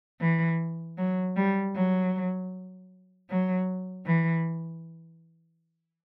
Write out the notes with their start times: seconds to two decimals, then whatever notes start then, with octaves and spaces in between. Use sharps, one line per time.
0.21 E3
0.98 F#3
1.36 G3
1.75 F#3
3.29 F#3
4.06 E3